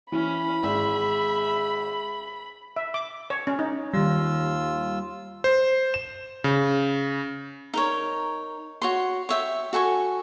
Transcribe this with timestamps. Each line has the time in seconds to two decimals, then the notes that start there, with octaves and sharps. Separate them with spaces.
0.12 E3 C#4 B5
0.63 G#1 G#4 E5
2.76 E5
2.94 D6
3.30 C#5
3.47 C#4
3.59 D#4
3.93 D#2 D#3 G3 F4 E6
5.44 C5
5.94 E7
6.44 C#3
7.74 D#4 A#4 C#5
8.82 F#4 C#5 C6
9.29 C#5 E5 G5
9.73 F#4 A4 G#5 C#6